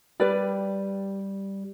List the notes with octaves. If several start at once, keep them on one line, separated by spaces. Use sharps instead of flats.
G3 G4 B4 D5